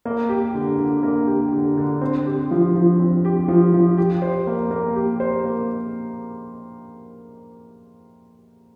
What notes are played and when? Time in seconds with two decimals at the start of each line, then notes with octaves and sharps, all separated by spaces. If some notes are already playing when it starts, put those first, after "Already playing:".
0.05 A#3
0.29 G4
0.55 D3
0.78 D3
1.03 A#3
1.27 G4
1.53 D3
1.77 D3
2.01 C4
2.26 G4
2.51 F3
2.75 F3
2.99 C4
3.25 G4
3.48 F3
3.73 F3
3.98 G4
4.22 C5
4.47 A#3
4.71 A#3
4.96 G4
5.20 C5
5.45 A#3